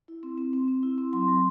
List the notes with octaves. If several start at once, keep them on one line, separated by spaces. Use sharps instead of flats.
E4
C4
C4
C4
C4
E4
C4
F#3 C6
F#3